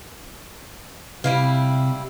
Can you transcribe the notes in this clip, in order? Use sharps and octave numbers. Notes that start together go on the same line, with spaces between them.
C3 G3 E4 F5